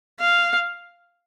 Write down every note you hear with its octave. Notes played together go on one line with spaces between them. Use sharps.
F5